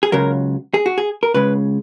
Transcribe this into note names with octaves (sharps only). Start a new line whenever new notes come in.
G#4
C#2 C#3 F#3 A#4
G#4
F#4
G#4
A#4
C#2 C#3 G#3 B4